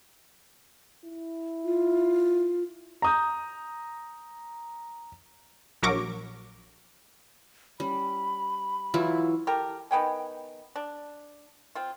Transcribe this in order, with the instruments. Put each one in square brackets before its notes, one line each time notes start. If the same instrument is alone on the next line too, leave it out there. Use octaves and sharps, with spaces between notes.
[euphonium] E4
[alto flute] F4
[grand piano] A#5 D#6 G6
[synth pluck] A#1 F#3 A#4 C#6 D6 A#6
[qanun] G3 [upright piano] C#4 [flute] B5
[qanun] E3 F#3 E4 [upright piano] F4
[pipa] G4 A4 A#4
D#3 B3 G5 G#5
D4
C4 F4